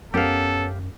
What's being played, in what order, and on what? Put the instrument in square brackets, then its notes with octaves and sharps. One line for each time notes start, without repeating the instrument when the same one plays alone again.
[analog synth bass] F#2 [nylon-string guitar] B3 C#4 A#4 [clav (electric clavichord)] G4 F5 [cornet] A4